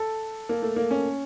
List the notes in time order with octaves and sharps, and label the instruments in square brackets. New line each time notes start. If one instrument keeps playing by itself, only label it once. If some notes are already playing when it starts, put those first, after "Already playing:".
Already playing: [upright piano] A4
A#3
A3
A#3
C#4